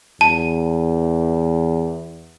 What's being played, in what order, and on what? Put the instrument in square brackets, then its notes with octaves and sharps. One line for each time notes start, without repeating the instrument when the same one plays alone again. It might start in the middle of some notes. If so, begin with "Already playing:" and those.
[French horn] E2 [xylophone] A5